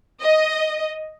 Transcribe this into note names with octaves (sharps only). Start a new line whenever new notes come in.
D#5